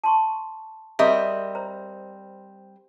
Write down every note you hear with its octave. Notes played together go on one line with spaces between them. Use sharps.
A5 C6 C#6
G3 C4 G#4 A#4 D#5 E5 A#5
C5 A#5